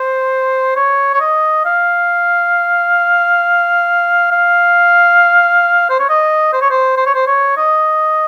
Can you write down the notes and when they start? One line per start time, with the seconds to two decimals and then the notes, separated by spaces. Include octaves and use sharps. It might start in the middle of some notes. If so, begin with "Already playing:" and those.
Already playing: C5
0.76 C#5
1.14 C#5
1.21 D#5
1.65 F5
4.31 F5
5.90 C5
5.99 C#5
6.09 D#5
6.53 C5
6.61 C#5
6.70 C5
6.97 C5
7.06 C#5
7.15 C5
7.27 C#5
7.57 D#5